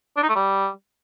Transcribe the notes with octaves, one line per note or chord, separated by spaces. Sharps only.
D4
D#4
A3
G3